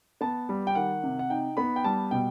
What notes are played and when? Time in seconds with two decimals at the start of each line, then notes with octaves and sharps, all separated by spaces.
0.21 B3 A5
0.49 G3
0.67 G5
0.75 D#3 F#5
1.03 C3
1.19 F#5
1.30 D#4 G5
1.57 B3 B5
1.76 G5
1.84 G3 A5
2.11 B2 G5